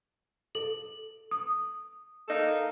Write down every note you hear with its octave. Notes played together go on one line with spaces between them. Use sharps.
A4 F#7
D#6
A#3 D#4 A4